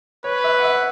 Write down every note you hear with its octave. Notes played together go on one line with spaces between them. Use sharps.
B4 C#5
E5
F#5
E5